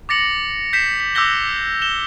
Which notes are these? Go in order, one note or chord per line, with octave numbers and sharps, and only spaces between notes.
D6 A6 A#6 C#7 F#7
G6 B6 C7 E7
B6
D6 E6 F#6 G6 A#6 G7
E7 G7